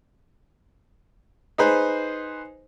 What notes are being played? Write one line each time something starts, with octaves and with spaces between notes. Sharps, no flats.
D#4 G#4 B4 C5